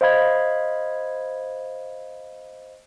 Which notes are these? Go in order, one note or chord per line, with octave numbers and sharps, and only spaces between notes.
C5 D#5 F5 B5 G#6